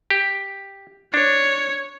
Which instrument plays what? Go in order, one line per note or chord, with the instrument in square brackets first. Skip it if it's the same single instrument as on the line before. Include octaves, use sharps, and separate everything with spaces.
[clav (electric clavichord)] G4
[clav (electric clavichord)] D4 [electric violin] C#5